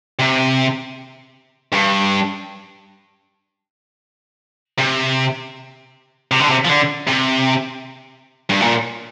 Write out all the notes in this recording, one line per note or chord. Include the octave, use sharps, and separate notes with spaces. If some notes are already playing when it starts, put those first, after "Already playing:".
C3
G2
C3
C3
D3
C3
F3
D3
C3
G2
A#2